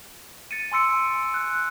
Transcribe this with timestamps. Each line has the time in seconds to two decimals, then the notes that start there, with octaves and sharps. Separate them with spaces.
0.51 A6 C#7 D#7
0.72 G#5 C6 E6 C#7 D7
0.91 C#7
1.34 F#6